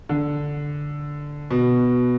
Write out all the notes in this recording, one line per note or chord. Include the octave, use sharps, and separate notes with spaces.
D3
B2